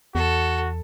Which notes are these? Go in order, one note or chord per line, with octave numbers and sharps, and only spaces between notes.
E2 F#4 A4